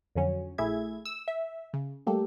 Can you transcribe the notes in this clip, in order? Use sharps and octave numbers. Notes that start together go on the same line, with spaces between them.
F2 D3 F#3 C#4
A#1 A3 E4 G#4 E5 G#6
E6
E5
C#3
G3 A3 A#3 G4 A4